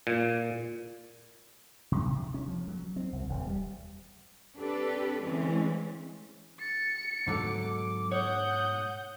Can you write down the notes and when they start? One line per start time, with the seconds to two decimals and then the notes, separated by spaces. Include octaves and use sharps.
0.07 A#2
1.92 C3
2.06 C3
2.34 C#4
2.48 F3
2.68 F#3
2.96 C4
3.13 C2
3.29 D#1
3.47 G3
4.57 C4 D4 G4 A4 B4
5.23 D3 E3 G#3 C4 C#4
6.61 A6 C#7
7.28 G#2 B2 D3 F#3 A3 D6
8.12 C#5 F#5 D#6 G6